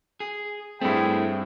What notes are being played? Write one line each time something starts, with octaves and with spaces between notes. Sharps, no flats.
G#4
G2 G3 A3 C4 E4 G#4 G5